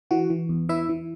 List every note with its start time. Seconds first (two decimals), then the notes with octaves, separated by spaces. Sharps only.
0.11 E3 F#4
0.30 E3
0.49 E2
0.69 E3 E4 E5
0.89 E3